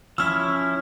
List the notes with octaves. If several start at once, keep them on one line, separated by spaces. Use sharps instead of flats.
F3 C#4 E4 E6 F6